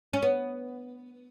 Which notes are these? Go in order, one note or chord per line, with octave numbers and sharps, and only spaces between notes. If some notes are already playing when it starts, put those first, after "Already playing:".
C#4
B3